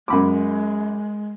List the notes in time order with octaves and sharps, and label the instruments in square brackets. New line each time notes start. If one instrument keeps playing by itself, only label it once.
[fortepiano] F#2 B5 D6 [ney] G#3